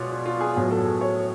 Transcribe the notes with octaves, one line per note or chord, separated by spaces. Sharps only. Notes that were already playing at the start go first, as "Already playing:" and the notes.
Already playing: B2 G#3 B3 F4 C#5 D5
F4
F4
G#4
A2 F#3 B3
A4
G#4
C#5